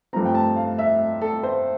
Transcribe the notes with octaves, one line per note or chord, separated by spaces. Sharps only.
G2 F3 A3 C4 A#5
G5
A5
F5
E5
A4
C5